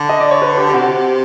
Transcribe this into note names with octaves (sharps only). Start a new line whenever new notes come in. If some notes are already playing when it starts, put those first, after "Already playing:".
Already playing: D3
D#5
D5
C#5
B4
G4
G4
C3 F#4